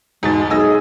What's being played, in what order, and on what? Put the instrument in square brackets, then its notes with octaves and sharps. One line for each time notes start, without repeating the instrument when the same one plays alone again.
[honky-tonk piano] E2 B2 A6 [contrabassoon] G#2 [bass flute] G#3
[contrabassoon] B1 [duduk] G#4 [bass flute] D#5 [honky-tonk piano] G#5 E6 A#6